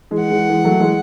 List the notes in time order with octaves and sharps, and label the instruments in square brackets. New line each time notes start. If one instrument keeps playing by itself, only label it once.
[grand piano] E3 G#3
[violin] F#5
[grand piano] E3 G#3
E3 G#3
F#3 A3
E3 G#3